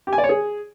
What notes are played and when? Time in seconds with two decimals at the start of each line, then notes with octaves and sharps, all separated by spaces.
0.07 G4
0.13 G#5
0.18 D5
0.24 C#5
0.29 G#4